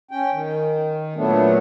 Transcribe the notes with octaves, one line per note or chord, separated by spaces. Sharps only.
C#4 G5
D#3
A#2 F#3 A3 B3 D4